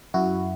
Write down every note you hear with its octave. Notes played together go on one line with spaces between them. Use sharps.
F#2 E4 F#4